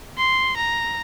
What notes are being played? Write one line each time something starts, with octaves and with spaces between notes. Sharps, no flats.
C6
A#5